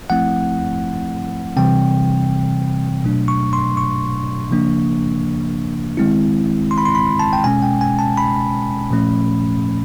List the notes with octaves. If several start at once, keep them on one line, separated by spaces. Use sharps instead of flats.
F3 A3 C4 E4 F#5
C3 E3 G3 C4 G5
B2 F#3 A3 D4
C#6
C6
C#6
C#3 F3 A#3 D4
D#3 G#3 C4 E4
C6
B5
C6
B5
A5
G5
B2 G#3 C#4 G#5
G5
G#5
A5
B5
A#2 F3 A3 C#4